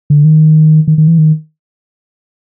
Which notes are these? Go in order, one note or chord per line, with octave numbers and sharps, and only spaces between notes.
D3
D#3
D#3
D#3
E3
D#3